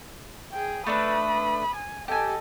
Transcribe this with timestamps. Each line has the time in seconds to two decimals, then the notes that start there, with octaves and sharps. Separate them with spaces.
0.52 G#4 G5
0.87 A3 D4 B4 B5 D#6
1.75 G#5
2.08 G4 A4 D#5 G#5